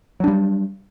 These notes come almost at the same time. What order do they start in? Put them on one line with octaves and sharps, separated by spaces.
F#3 D4 G3